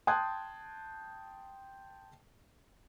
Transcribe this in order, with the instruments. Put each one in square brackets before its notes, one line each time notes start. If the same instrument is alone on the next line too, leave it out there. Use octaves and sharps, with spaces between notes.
[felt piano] G5 A5 C6 D#6 F#6 G#6